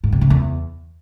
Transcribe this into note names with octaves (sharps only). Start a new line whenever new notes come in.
G#2
C3
C#3
E2